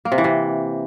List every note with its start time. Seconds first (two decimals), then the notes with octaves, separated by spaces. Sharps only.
0.05 A#3
0.12 C3
0.18 E3
0.24 C3